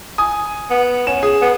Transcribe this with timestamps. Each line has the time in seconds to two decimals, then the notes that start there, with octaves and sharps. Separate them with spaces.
0.18 G#5 D#6
0.70 B3
1.07 C#4 E7
1.23 G#4
1.41 B3